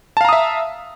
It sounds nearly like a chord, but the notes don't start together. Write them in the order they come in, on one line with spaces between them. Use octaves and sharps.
A5 F5 A#5 D#6 E5